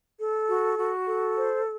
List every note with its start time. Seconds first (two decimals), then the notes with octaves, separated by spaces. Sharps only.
0.20 A4
0.48 F#4
0.78 F#4
1.07 A4
1.37 C5